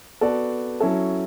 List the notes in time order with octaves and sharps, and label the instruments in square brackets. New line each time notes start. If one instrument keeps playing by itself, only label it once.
[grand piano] B3 F#4 A4 D5
F#3 C#4 E4 A4